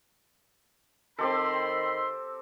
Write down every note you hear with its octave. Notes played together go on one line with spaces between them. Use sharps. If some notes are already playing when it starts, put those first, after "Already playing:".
D#3 C4 G4 A4 B5 C6